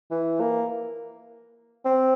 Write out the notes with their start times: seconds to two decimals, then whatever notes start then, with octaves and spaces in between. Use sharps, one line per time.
0.11 E3
0.40 A#3
1.85 C4